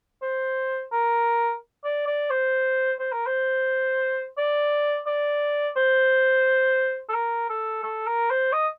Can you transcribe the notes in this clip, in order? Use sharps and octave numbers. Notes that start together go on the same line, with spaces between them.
C5
A#4
D5
D5
C5
C5
A#4
C5
D5
D5
C5
A4
A#4
A4
A4
A#4
C5
D#5